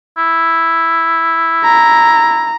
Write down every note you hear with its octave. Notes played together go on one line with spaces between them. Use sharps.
E4
A#5